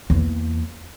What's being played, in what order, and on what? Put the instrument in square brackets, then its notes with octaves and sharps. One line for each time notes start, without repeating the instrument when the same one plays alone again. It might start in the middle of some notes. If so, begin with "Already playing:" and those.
[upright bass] E2 A#3